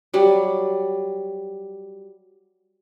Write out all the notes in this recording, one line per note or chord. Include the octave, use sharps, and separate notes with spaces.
F#3 G3